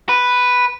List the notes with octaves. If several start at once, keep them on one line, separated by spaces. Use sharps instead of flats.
B4